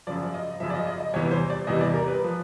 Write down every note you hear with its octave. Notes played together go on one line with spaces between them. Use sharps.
F#2 C#3 F3 D5
D#5
F#2 C#3 F3 E5
D5
D#5
D#5
D#5
E2 C3 E3 G3 C#5
C5
D5
E2 C3 E3 G3 D#5
D5
A#4
B4
F3